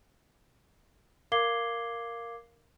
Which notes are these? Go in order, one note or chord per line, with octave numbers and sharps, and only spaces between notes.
A#4 F5 D6 G#6 C7 G7